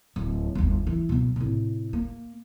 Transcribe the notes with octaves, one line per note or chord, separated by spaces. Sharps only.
D1
G1 D#2
E3
B1 B2
A2 C3
A#3